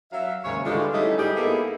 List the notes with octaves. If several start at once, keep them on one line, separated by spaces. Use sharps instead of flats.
F#3 E5 F5
D#2 G#2 C#3 C#5
D3 E3 G3 G#3 F4 D5
G3 A3 C#4 D#4 E4
G#2 G3 G4 G#4
A#3 B3 D#4 E4 G#4 A4